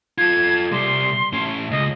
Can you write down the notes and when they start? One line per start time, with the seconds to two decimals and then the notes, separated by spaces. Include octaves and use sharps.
0.18 F4 A4 G#6
0.72 C3 G3 C6
1.33 A2 C#4
1.71 C#2 D#5